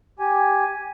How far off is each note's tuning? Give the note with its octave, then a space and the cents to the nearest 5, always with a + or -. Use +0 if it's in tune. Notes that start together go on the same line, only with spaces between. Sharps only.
G4 +0 G#5 +0